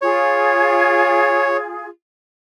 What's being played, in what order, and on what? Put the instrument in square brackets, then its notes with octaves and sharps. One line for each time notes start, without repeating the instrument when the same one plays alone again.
[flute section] F4 G#4 [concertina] C#5